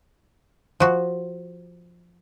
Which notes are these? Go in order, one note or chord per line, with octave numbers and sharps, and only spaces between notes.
F3 F#4